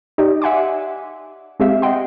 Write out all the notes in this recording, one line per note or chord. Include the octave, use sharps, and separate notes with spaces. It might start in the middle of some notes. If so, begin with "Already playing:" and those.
D#4 G4 D5 D#5
E5 F#5 G#5 C6 D6
G#3 C4 G4 E5 F5
D#5 F#5 G5 C6